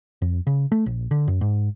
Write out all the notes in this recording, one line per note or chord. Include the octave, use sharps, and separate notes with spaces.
F2
C#3
A3
A#1
D3
F#2
G#2